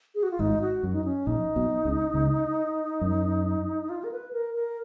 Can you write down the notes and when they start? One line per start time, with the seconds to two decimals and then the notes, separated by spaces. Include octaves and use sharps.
0.15 G#4
0.23 F#4
0.31 F4
0.39 G#1 G#2 D#4
0.61 F#4
0.83 F#2
0.93 D#4
1.04 C#4
1.27 A#1 A#2 D#4
1.56 B1 B2
1.85 C#2 C#3
2.14 C#2 C#3
3.01 F#2
3.89 F4
4.04 A#4
4.12 B4
4.33 A#4
4.55 A#4